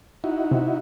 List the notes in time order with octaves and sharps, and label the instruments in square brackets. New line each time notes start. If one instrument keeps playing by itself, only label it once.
[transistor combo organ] D#4 E4 F#4
[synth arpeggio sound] C3